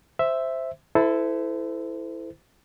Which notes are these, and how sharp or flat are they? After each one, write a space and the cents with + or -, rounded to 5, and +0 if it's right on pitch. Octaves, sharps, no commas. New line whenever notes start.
C5 +0 E5 +0
E4 +0 A4 +0 C5 -35